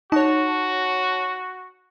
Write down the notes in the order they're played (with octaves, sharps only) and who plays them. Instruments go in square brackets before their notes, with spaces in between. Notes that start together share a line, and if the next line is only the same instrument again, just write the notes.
[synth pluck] D#4 [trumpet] F#4 [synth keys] C#5 A5